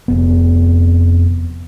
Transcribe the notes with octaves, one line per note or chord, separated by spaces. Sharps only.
F1 B3